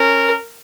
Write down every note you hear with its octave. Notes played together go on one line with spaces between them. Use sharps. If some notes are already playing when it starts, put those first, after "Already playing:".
Already playing: C#4 A#4